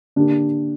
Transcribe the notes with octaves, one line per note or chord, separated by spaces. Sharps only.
D3 A#3 D4 G4